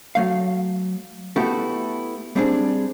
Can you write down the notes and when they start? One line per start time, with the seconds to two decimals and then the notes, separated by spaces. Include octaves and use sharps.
0.15 F#3 A3 F5
1.36 A3 B3 E4 F#4 G4 A4
2.36 G3 C4 D4 G#4